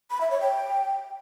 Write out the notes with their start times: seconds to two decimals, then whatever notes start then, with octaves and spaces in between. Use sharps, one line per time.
0.11 B5
0.21 E5
0.31 C#5
0.41 G5